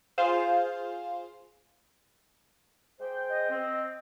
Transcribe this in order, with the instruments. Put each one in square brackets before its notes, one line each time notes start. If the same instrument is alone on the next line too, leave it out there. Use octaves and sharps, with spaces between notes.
[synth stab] F4 G#4 C5 F5
[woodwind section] G#3 C5 G5
[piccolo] D#5
[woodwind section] C4